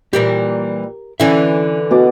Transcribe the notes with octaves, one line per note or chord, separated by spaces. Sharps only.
A#2 E3 G3 G4 A#4
D3 E3 C#4 E4 E5
B2 D5 D6